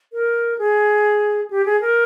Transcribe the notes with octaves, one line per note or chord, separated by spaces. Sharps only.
A#4
G#4
G4
G#4
A#4